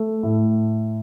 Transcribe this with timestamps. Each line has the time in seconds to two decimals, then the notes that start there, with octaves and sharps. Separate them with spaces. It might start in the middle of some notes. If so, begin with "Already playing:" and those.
Already playing: A3
0.23 A2